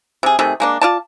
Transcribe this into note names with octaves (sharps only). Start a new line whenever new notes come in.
C3 G#4
C3 D#3 A3 G#4
G#3 A#3 D4
F4 D5 A5